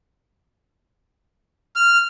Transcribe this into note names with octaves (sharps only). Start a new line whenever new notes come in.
F6